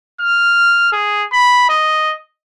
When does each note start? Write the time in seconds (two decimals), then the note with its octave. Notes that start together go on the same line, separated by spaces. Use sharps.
0.21 F6
0.92 G#4
1.32 B5
1.69 D#5